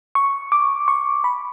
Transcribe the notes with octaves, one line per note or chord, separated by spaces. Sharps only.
C#6
D6
C#6
B5